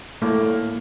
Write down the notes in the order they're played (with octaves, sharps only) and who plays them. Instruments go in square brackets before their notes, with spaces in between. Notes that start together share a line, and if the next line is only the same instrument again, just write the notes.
[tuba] A2 [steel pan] A3 [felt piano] A#3